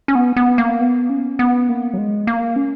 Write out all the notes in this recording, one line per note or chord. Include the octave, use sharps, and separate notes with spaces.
C#4
B3
B3
A#3
B3
C#4
B3
A#3
F#3
G#3
A#3
C#4